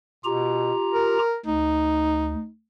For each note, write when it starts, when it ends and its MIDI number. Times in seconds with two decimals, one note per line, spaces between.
0.25 0.72 47
0.25 1.19 65
0.25 1.19 67
0.25 1.19 82
0.94 1.37 70
1.46 2.35 38
1.46 2.49 63